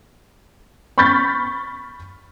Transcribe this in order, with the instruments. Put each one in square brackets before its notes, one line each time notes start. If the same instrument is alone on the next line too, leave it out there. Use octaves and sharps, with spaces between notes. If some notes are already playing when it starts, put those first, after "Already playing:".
[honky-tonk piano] B5 C#6 F6 G6 A6 B6